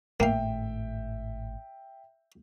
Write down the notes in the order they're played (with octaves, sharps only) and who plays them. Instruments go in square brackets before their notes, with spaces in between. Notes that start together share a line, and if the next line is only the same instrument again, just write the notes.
[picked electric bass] G#1 A2 A3 [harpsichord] A#3 F5 [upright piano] E5 G5